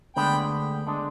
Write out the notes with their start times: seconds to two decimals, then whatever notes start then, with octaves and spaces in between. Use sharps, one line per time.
0.16 D2 D3 G#3 B3 D4 G5 B5
0.87 D3 G#3 D4